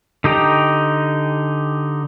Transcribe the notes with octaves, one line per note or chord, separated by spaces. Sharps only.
D3 D#4 G4 G5 A#5